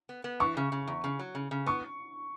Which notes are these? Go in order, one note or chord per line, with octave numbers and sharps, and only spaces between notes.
B3
B3
E3 C#6
C#3
C#3
E2
C#3
F#3
C#3
C#3
B3 C#6